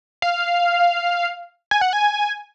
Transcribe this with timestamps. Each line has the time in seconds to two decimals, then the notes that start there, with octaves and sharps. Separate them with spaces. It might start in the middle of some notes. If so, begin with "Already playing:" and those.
0.22 F5
1.71 G#5
1.81 F#5
1.93 G#5